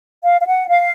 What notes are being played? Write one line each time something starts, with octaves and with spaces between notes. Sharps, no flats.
F5
F5
F#5
F5